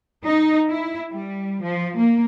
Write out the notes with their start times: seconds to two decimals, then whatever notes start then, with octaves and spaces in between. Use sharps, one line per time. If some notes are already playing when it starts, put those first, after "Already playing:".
0.25 D#4
0.69 E4
1.11 G3
1.62 F3
1.97 A#3